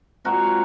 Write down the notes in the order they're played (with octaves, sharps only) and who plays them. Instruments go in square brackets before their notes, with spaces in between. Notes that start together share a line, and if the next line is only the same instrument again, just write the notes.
[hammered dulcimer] A#2 G#3 C4 F#4 A#4